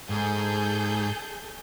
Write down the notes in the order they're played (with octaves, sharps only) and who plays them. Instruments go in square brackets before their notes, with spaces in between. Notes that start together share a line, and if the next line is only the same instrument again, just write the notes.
[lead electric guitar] G#2 [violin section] G#4 A4 G6